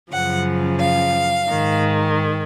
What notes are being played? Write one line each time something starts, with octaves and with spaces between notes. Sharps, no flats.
F#2 C#3 F3 F#5
F5
G#2 D#3